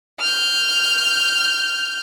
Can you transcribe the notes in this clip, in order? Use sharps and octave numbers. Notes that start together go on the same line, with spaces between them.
F6 G6